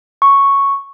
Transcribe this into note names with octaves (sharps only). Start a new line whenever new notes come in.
C#6